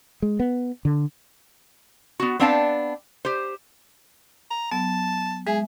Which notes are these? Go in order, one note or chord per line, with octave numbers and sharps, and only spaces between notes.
G#3
B3
D3
B3 F#4
B3 C4 D4 F5 G5 A5
G4 C5
A#5
F#3 B3 A5
G#3 G#4 E5